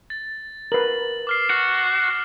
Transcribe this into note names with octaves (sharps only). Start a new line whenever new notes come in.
A6
A#4 B4 F#7
D6 F6 C7
F#4